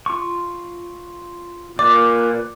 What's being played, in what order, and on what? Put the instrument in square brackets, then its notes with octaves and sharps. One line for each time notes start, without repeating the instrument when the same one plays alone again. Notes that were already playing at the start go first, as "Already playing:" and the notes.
[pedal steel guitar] F4 C#6
[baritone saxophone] A#2 [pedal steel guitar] B4 D5 [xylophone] D6